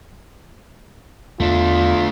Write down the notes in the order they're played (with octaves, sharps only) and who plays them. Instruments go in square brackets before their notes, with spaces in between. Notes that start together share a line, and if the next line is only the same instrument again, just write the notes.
[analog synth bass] E2 [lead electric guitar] A3 D4 [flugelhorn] F4